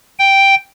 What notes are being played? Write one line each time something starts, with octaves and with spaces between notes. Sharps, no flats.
G5